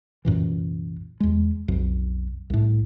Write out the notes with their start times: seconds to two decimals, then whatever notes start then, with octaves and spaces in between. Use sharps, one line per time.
0.25 C2 F#2 A#2 E3
1.20 E2 G#3
1.68 B1 F2
2.50 C2 A2